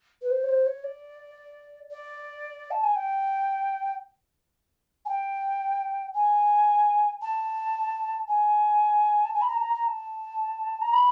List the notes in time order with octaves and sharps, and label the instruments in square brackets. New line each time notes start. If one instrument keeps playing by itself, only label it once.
[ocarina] B4
C5
C#5
C5
C#5
D5
D5
A5
G#5
G5
G#5
G5
G#5
A5
G#5
A5
G#5
B5
A#5
A5
A#5
A#5
A5
A#5
B5